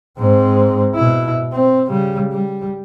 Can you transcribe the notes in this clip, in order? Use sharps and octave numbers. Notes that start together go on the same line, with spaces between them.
G#2 C4
B2 E4
C4
C#3 G3
G3